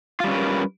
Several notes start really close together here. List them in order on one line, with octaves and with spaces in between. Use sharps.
F4 G3 C#4 B4 A#4